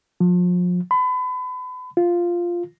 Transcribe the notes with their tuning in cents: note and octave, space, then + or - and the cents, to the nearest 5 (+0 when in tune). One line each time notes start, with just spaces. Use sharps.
F3 +35
B5 +35
F4 -5